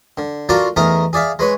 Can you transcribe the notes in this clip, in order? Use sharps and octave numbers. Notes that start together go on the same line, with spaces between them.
D3
D4 F4 F#4 A4 A#4 D5
E2 A3 D#4 A#4 A#5 D#6
G#4 D5 E5 F5
G#3 B4 C#5